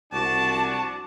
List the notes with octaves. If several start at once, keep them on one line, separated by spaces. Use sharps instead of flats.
C2 D4 F#4 A5